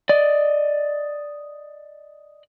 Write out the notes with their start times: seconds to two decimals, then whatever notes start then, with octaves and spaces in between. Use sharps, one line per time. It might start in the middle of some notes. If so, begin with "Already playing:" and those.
0.09 D5 D#5